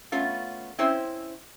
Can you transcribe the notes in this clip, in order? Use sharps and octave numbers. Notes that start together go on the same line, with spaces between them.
A3 B3 C#4 F4
C4 C#4 E4 C5